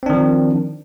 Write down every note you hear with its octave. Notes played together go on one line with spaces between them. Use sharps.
D#3 F3 C4 D4